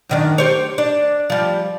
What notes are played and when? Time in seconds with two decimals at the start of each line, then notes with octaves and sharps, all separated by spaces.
0.09 F#2 D#3 D4
0.38 G4 C5 C#5
0.78 D4
1.30 F3 G3